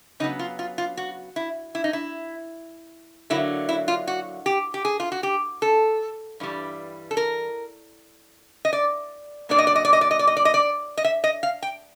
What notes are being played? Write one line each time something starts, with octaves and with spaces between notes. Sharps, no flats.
C#3 F#3 B3 D#4
F4
F4
F4
F#4
E4
E4
D#4
E4
D3 F#3 A#3 E4
E4
F4
F#4
G4
G4
G#4
F4
F#4
G4
A4
G2 E3 G3
A4
A#4
D#5
D5
A#2 F#3 A#3 D4 D5
D#5
D5
D#5
D5
D#5
D5
D#5
D5
D#5
D5
D#5
D5
D#5
E5
D#5
F5
G5